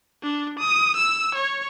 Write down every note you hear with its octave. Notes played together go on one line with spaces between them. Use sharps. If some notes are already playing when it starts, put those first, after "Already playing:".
D4
D#6
E6
C#5